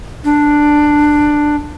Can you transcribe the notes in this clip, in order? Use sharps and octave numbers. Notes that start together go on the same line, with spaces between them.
D4